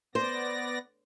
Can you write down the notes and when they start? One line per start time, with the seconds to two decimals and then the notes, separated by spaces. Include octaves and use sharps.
0.15 B3 C5 D5 A#6